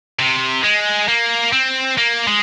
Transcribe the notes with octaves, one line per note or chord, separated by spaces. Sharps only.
C3
G#3
A#3
C4
A#3
G#3